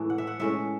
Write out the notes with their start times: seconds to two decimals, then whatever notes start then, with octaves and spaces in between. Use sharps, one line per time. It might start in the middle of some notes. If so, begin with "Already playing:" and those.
Already playing: A2 E3 G#3
0.10 F#5
0.18 E5
0.27 F#5
0.40 A2 G#3 C#4 E5